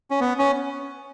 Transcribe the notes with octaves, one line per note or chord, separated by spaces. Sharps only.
C#4
B3
C#4